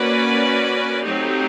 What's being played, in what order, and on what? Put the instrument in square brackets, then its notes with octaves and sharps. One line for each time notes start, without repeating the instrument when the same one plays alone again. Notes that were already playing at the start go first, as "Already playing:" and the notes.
Already playing: [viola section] A#3 C#4 F#4 B4 D5
F#3 A3 C4 D#4 G4